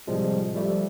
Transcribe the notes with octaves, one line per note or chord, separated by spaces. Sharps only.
A2 C3 F3 G3 G#3
F3 G3 A3